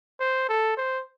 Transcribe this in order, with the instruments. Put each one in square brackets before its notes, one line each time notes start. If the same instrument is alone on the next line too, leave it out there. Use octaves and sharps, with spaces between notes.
[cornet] C5
A4
C5